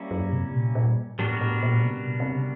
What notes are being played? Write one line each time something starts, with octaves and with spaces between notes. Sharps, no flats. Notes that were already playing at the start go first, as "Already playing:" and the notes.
Already playing: G3 A#3 C#4 E4
F#2
C3
A#2
A#2
A2 G3 B3 D4 F#4 A#4
A2
A#2
C3
A#2
C3
C#3